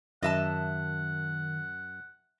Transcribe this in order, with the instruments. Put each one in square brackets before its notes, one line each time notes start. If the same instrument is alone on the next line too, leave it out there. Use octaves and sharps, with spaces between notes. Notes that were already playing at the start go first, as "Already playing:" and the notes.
[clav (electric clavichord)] F#2 [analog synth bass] D#3 [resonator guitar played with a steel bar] D#5 E5 A5 [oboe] F#5